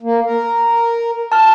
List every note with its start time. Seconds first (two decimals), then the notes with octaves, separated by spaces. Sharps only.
0.02 A#3
0.25 A#4
1.32 A5 F6